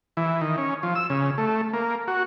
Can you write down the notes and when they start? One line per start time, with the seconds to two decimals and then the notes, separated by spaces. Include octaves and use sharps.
0.17 E3
0.41 D#3
0.58 C#4
0.83 F3
0.95 E6
1.10 C#3
1.38 A3
1.73 A#3
2.08 F#4